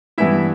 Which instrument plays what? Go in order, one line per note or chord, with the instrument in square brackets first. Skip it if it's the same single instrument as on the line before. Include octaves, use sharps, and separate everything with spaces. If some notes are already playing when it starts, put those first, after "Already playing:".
[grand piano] G2 E3 B3 E4 E5